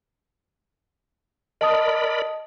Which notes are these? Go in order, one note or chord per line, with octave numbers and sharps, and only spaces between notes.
A#4 D5 D#5 A5 B5 D#6